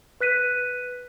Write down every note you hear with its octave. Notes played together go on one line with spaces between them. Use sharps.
B4 F#6 B6 D#7